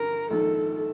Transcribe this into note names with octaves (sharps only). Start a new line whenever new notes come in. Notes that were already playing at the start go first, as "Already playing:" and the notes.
Already playing: G2 D3 A#4
A#1 G#2 D#3 A4